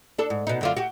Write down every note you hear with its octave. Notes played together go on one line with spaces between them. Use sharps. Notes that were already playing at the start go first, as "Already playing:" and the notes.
D4 A4
G#2
B2 D#4
F#2 D3 F4
F#4 G4